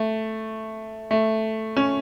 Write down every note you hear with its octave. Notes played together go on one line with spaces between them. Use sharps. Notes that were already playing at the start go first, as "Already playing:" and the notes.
Already playing: A3
A3
C#4